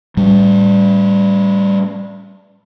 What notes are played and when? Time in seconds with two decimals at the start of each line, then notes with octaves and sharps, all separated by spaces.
0.17 A2 G3